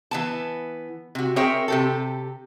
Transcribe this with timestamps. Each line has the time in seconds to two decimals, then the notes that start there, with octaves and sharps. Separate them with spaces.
0.11 E3 B3 A5
1.15 C3 F#4
1.36 C4 G#4 A#4 C#5 E5 G5
1.68 C3 G4 A4